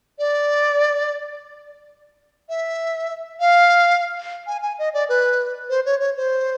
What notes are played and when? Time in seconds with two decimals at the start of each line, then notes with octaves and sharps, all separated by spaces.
0.19 D5
2.49 E5
3.40 F5
4.47 G#5
4.62 G#5
4.79 D#5
4.94 D5
5.09 B4
5.70 C5
5.86 C#5
6.00 C#5
6.16 C5